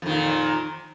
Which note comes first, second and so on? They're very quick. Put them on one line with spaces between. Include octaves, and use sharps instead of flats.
F2 D#3 A#2